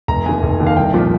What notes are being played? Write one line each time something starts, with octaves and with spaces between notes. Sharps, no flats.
F1 A#5
D#2 D#3 G#5
F1
D#2 D#3
F5
C2 G5
A#2 F3